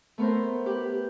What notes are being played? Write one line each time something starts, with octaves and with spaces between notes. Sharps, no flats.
A3 B3 A#4 C5
G4 B4